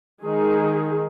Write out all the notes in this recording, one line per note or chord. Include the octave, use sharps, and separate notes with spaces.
D#3 G#3 D#4 G#4